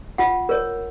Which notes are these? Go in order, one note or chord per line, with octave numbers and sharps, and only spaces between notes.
F4 F#5
A#4 C#5